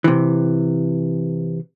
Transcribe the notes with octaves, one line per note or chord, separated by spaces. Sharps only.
C3 E3